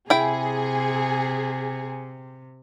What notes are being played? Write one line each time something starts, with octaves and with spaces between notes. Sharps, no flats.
C3 E4 G#4 G5